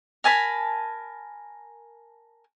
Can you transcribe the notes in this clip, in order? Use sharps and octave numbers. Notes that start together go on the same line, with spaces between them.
A#4 G#5 A5 B5